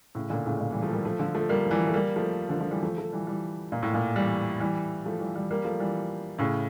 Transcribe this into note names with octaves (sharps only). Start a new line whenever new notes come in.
A2 C#3
A#2 D3
A2 C#3
A#2
E3 G3
F3 A3
G3 A#3
F3 A3
D3 F3
F3 A3
G3 A#3
F3
E3 G3
A3
G3 A#3
F3 A3
D3 F3
D3 F3
E3 G3
F3 A3
F3 A3
E3 G3
E3 G3
A#2
A2
A#2
E3 G3
E3 G3
F3 A3
E3 G3
E3 G3
G3 A#3
F3 A3
E3 G3
A2 C#3